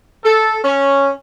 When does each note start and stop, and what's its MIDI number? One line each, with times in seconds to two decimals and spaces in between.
0.25 0.59 69
0.64 1.12 61